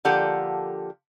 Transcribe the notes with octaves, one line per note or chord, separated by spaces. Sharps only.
D3 F3 A#3 G4 A4 F#5